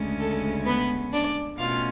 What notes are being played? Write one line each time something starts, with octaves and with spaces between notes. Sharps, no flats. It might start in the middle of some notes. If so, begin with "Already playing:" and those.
Already playing: D2 C#3 G#3 C#4
A4
B3 B4
D4 D5
B2 A3 C#4 F4 F5